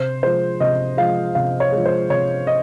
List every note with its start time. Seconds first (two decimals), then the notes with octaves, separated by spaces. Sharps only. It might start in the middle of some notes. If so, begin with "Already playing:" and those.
Already playing: C3 C5
0.23 F3 G#3 C5
0.60 C3 D#5
0.97 F3 G#3 F5
1.35 C3 F5
1.60 C#5
1.72 F3 G#3
1.86 C5
2.10 C3 C#5
2.47 D#5